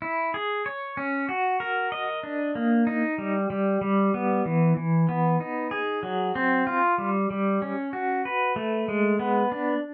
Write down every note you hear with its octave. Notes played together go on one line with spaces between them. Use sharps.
E4
G#4
C#5
C#4
F#4
A#4
D#5
D4
A#3
D#4
G3
G3
G3
B3
E3
E3
B3
D#4
G#4
F#3
C4
F4
G3
G3
C#4
F#4
B4
A3
G#3
B3
D4